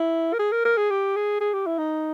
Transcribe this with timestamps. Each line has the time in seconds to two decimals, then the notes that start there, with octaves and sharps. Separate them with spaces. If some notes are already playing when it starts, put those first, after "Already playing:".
Already playing: E4
0.33 A#4
0.39 G#4
0.52 A#4
0.65 A#4
0.77 G#4
0.90 G4
1.16 G#4
1.41 G#4
1.53 G4
1.66 E4
1.78 D#4